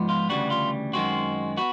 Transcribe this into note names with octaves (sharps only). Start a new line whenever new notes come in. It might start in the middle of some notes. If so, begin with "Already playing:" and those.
Already playing: G#2 F3 G#3 B3
F4
D2 C#3 E3 G3 F#4
F4
F#2 D#3 G#3 C4 F#4
B3 F#4